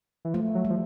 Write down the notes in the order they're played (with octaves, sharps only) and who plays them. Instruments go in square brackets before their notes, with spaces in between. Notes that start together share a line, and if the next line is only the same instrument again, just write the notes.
[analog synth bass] E3
[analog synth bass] F3 [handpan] A3
[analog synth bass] F#3
[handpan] G3
[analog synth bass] F3